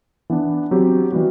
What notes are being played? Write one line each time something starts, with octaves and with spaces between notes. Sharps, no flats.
E3 B3 D4
F#3 C4 G4
E3 G3 B3 F#4